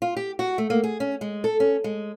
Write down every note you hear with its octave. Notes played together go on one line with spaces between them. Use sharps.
F4
G4
F#4
A3
A#3
G#4
C#4
G#3
A4
C#4
G#3